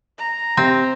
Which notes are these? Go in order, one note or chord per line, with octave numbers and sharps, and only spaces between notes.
A#5
C3 C4